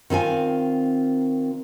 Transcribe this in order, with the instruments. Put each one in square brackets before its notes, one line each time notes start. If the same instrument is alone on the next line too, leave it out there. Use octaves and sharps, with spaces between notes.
[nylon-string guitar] D#3 C4 F4 G#5